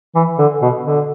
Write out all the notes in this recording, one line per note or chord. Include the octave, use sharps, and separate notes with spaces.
E3
D3
B2
D3